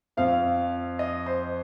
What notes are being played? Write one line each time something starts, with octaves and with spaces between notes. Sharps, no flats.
F2 F3 C4 F5
D#5
C5